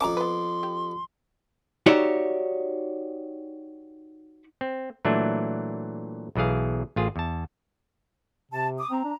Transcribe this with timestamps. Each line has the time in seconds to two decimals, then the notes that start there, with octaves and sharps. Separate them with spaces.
0.01 F2 C#4 A5 A#5 D6
0.17 B3 B4 C6
0.63 G4
1.86 D#4 F#4 G4 C#5 D5 E5
4.61 C4
5.05 A#2 E3 F#3 A3 D4
6.36 B1 B2 E3 G#4 F5
6.96 A1 F4 G#4
7.16 E2 A5
8.51 C3 A5
8.78 D6 D#6
8.91 C4 A#5
9.04 D4